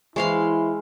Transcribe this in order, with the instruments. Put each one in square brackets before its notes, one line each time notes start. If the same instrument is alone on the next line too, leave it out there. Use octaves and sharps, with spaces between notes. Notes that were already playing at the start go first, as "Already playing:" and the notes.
[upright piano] E3 C5 C#6 [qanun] G#3 F5 C6 [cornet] E4